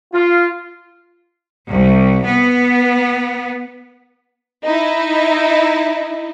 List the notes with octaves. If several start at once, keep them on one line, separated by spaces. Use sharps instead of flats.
F4
C2
B3
D#4 E4